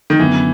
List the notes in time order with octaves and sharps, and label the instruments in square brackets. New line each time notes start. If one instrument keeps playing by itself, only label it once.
[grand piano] D#3
[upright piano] F#2 D3 F#3 B3 [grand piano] E3